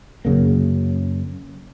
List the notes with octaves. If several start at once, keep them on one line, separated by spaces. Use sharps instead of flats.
F#2 C#3 A#3